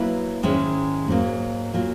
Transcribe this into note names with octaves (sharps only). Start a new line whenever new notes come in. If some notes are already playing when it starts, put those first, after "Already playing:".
Already playing: F#3 A#3 E4 B4
G#2 D#3 G#3 C#4 E4
G#2 F#3 A#3
A#2 F#3 A#3